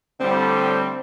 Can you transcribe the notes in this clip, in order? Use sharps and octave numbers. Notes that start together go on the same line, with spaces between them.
A2 D3 G3 C4